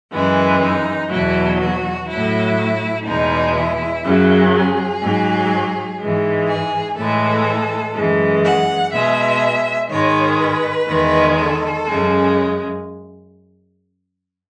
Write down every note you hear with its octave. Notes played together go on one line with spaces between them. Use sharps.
F#2 E3 G#3 B4
D#4
E2 B2 F#3 E4
F#4
A2 F#3 E4
E2 B2 G#3 D#4
E4
F#2 C#3 F#3
G#4
G#2 F#3
G#2 E3 G#3
G#4
A2 E3 G#3 A4
F#2 E3 G#3
F#5
B2 G#3 E5
G#2 D#3 G#3 C#5
B4
E2 D#3 G#3
A4
F#2 C#3 G#3